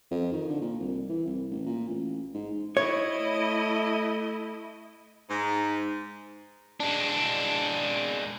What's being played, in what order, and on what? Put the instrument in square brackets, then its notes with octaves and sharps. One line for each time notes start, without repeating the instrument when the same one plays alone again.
[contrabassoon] F2
D#3
D3
A#2
C2
E3
C2
A1
A#2
A1
G#2
[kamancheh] E4 D#5 [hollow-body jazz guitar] C#5
[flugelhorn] A3
[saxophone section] G#2
[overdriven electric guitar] G#3 D4